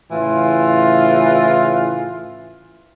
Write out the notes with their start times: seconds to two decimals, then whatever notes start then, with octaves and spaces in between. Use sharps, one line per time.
0.12 A2 C#3 E3 F4